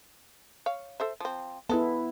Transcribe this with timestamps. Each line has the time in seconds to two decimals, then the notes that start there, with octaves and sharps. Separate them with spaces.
0.66 C#5 F5
1.00 A4 C5 E5
1.20 F3 C4
1.69 G#3 B3 E4 A4